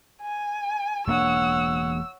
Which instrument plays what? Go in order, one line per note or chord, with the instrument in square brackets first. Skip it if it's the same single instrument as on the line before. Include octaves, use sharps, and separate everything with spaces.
[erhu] G#5
[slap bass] E1 A#3 D4 [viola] C#5 F#5 [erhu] E6